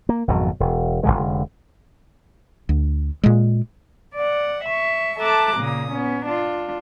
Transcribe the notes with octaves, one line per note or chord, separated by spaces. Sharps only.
A#3
G#1 F2 B2 F#3
E1
F1 D#2 D3 G#3
D2
A#2 G#3
D5 F#5
E5 C#6
A4 E5 A5 A#5 D6 F#6
A#2 C#3 A#3 D#6
B3 C#4
D4 F4